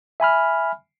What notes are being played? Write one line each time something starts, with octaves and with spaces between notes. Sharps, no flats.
E5 G#5 B5 F6